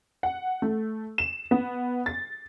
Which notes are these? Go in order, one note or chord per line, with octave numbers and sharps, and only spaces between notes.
F#5
A3
E7
B3
A6